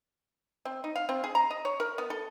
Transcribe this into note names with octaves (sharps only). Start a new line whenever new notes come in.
C4
D#4
F5
C4
G#4
A#5
D#5
C#5
A#4
B3
A4